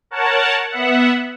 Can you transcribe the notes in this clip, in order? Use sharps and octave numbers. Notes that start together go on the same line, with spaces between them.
A#4 C#5 F#5 A5
B3 E5 F#5